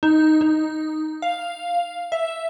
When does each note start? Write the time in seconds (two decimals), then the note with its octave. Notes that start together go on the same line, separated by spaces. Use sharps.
0.03 D#4
0.41 D#4
1.22 F5
2.12 E5